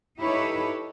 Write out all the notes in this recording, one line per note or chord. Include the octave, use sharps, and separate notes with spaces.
D#4 E4 G4 A4 B4 C#5